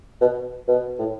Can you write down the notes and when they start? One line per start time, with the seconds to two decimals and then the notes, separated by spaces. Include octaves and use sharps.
0.21 B2
0.68 B2
0.99 A2